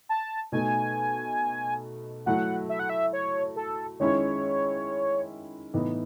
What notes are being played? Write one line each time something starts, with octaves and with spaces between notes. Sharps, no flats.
A5
B2 A3 D#4 G#5
F#3 A3 E4 F#5
E5
F#5
E5
C#5
A4
D#3 G#3 C#4 E4 C#5
A2 E3 B3 D#4